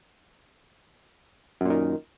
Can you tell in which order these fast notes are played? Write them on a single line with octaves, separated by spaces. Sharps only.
F#2 A#2 D#3